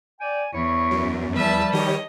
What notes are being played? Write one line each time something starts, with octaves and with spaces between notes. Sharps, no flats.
D5 G5 G#5
E2 E4 C#5 B5 C#6
F#2
E2 F3 G3 B4 E5 A5
D#3 G4 C#5 D#5